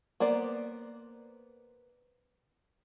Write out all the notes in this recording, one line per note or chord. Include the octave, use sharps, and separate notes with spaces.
A#3 B3 C5 D5